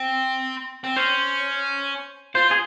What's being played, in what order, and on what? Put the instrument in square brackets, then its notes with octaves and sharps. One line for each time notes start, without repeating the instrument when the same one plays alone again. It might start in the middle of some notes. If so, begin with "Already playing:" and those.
Already playing: [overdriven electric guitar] C4
C4
[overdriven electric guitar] C#4 [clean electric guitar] C5
[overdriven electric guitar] F4 [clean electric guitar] C5
[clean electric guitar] G#4